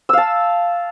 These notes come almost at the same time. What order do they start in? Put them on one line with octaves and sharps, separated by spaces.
E6 F5 A5